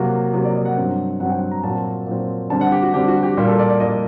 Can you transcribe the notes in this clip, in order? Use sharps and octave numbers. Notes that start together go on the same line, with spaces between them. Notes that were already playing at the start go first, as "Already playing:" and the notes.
Already playing: C3 F#3 A#3 F#4
C3 F#3 A#3
D5
D#5
F#5
G2 F#3 C4
G2 F#3 C4 F#5
G5
F#5
A#5
A#2 F#3 C4 A5
A#2 F#3 C4
D3 G3 C4 A5
F#5
G4
F#4
D3 G3 C4 G4
F#4
G4
A#2 G3 A#3 G4
A4
D5
D5
A#2 G3 A#3 D#5